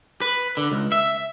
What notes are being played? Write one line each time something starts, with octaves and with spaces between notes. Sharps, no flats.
B4
D3
C#2
E5